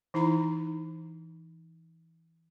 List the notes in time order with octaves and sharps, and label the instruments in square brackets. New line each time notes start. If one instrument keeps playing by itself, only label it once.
[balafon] E3 D#4 E4 A#5